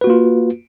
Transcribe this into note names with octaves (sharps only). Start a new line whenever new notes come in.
A#3 F4 F#4 B4